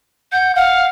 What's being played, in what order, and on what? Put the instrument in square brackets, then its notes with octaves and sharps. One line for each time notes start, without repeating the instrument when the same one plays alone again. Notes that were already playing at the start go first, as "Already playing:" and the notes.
[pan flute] F#5 [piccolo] G6
[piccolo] F5 [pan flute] F#5